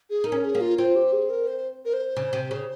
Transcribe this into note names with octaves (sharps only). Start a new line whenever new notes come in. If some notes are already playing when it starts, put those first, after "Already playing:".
G#4
D#4 A#4
C#4
G#4
A#3
F4
C4 F4
G4
G#4
A#4
C5
A#4
C5
C#3
C3
C#3